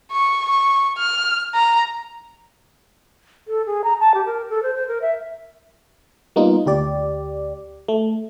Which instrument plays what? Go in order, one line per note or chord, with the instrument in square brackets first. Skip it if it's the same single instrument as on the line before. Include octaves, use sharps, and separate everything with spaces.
[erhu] C#6
C#6
F6
A#5
[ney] A4
G#4
A#5
A5
G4
A#4
A4
C5
C5
A#4
E5
[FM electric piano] G3 A#3 B3 D#4 F4
D2 G4 D5
A3